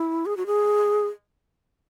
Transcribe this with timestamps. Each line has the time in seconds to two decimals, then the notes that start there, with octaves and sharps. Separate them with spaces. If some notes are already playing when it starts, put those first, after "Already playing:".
Already playing: E4
0.26 G#4
0.37 F#4
0.46 G#4